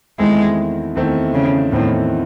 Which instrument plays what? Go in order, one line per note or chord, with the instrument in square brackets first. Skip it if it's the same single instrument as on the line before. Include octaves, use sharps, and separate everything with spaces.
[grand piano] E2 D#3 A3 C4 E4 [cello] G#3
[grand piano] E2 D#3 A3 C4 E4
[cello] C#3
[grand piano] E2 D#3 A3 C4 E4 [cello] A2